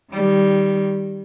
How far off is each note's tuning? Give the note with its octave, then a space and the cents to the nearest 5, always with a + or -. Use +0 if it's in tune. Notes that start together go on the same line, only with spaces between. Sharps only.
D#3 +0 G3 +0